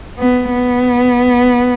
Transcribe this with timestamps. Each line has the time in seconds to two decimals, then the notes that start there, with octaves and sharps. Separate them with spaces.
0.18 B3
0.51 B3